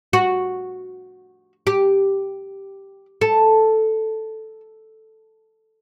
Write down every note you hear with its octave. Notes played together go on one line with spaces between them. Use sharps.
F#4
G4
A4